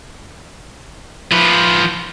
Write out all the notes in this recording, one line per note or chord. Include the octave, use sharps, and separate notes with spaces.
F3 B4